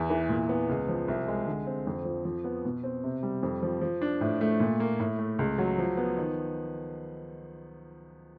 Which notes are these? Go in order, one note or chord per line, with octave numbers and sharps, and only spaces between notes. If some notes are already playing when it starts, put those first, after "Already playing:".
Already playing: E2
E3
A#2
B3
C#2
F3
C2
G#3
D3
C4
F2
F3
F3
B3
B2
C4
C3
G3
F2
F3
F3
D4
A2
A3
A#2
A#3
A2
A3
C#2
F#3
F3
B3
D#3